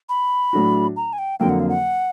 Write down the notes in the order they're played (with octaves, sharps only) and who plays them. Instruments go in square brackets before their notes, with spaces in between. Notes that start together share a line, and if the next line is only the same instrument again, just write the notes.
[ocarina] B5
[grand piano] A2 F#3 A3 D4 F#4
[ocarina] A#5
G#5
G5
[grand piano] F2 D3 F#3 A#3 [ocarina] G5
[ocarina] F#5
F5
F#5